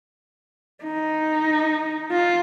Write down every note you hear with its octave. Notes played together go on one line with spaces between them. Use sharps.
D#4
F4